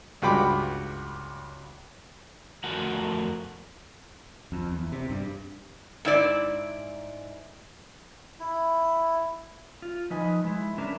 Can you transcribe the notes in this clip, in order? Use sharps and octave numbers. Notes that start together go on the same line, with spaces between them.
C#2 G2 F#4 G5 B5 D6
F2 A3 F#4 A#4 F#5 A5
F2
E2
C3
G2
G#2 E4 D5
E4
F4
F3 D#4 B4 D#5 G#5
G#3 E4
G#3 C#4 D4 E4 A#4 B4